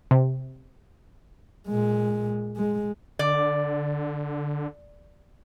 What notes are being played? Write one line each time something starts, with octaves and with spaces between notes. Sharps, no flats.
C3
A#2 G#3
G#3
D3 D5